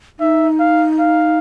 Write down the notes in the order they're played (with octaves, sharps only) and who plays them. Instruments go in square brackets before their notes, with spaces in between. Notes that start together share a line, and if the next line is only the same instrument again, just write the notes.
[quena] D#4 [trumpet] E5
[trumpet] F5
F5